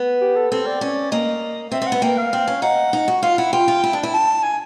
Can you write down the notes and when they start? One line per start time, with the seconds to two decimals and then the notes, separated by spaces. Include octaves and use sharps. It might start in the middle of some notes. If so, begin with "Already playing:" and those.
Already playing: B3
0.21 G4
0.37 A4
0.51 C4 A4
0.66 D5
0.81 C#4
1.12 A#3 D#5
1.72 C4 E5
1.82 C4
1.87 B3 F#5
2.02 A#3 G5
2.18 F5
2.33 C4
2.47 C#4
2.62 D#4 F#5
2.93 D#4
3.08 F#4
3.23 F4 F5
3.38 E4 F#5
3.53 F4 G5
3.68 F4
3.83 E4
3.93 D4
4.03 E4
4.14 A5
4.43 G#5